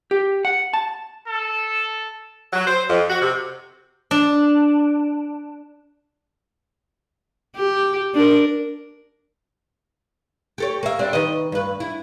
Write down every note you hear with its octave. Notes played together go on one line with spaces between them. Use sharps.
G4
F#5
A5
A4
F#3
C5
F2
F#4
C3
D4
G4
D4 A#4
G4 A4 C#5
A#3 E5
G3 C4 D4
D#3 B4 D#5
G2 B4
E4